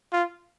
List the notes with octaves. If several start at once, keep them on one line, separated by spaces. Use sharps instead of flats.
F4